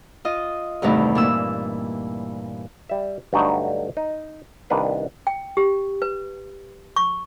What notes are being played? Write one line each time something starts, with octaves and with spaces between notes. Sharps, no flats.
F4 D#5
E2 G2 C3 D#3 A3
A#2 E3 E6
G3 E5
G2 D3 F#3 A3 D#4
D#4
C2 D#3 D4 B4 F5
G5
G4
B4
C#6